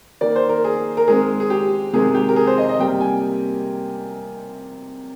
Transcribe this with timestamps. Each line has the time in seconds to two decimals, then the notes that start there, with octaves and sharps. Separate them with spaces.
0.21 D#3 A#3 D5
0.36 C5
0.49 A#4
0.64 G#4
0.97 A#4
1.08 D#3 G#3 C4 G#4
1.40 G#4
1.50 G4
1.93 C3 D#3 G#3 G#4
2.15 G4
2.29 A#4
2.36 G#4
2.47 C5
2.58 D#5
2.69 D#5
2.79 C3 G3 A#3 G5
3.01 G#5